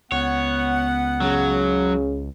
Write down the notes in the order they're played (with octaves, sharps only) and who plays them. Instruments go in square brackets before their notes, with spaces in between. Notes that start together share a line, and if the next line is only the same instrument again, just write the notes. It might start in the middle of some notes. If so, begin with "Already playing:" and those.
[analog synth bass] C#2 [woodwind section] B3 F#5 [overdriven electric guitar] C#5
[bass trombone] C#3 [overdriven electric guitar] F#3